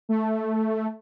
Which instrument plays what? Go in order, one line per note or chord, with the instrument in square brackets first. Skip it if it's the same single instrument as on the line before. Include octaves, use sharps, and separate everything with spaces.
[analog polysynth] A3